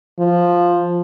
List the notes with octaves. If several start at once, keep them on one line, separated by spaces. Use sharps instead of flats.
F3